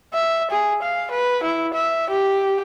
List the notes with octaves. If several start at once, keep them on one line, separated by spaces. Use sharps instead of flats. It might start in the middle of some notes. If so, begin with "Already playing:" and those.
E5
G#4
F5
B4
E4
E5
G4